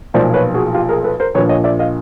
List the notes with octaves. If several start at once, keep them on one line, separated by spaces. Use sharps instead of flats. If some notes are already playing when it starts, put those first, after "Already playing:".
B1 A#2 F3 C5 D5
B4 C#5
F#4 G#4
F4 G4
G#4 A#4
A4 B4
A#4 C5
A#1 A#2 F3 B4 C#5
C#5 D#5
D5 E5
D#5 F5